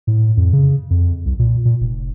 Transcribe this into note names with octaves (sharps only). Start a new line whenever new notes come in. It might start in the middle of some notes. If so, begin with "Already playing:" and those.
A2
F2
C#3
F2
C2
A#2
A#2
F1